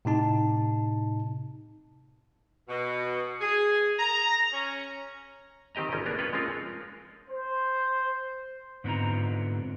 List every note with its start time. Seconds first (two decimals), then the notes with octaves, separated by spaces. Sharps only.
0.05 A2 C3 D#4 A5
2.68 B2
3.41 G#4
3.99 A#5
4.52 C#4
5.75 D#3 C4 G4 D#5 A#5
5.92 G#1 F3 G3 C#4 D#5
6.06 A#3 B3 D4 A#4
6.19 C#4 F4 B4 C#5 G5
6.33 F3 G#3 C4 C#4 F4 A#4
7.29 C5
8.84 G#2 D3 B3 C4 F4 A#5